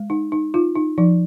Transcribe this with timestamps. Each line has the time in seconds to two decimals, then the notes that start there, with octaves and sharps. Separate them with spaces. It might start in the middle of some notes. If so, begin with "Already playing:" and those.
Already playing: G#3
0.10 D#4
0.32 D#4
0.54 D#4 F4
0.75 D#4
0.98 F3 D#4